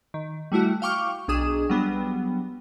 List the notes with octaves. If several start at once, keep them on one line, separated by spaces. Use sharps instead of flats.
D#3
G3 A3 E4 F#4
F5 G5 C#6 D6 F6
B1 D4 G#4 D#6 E7
F#3 G3 B3 D4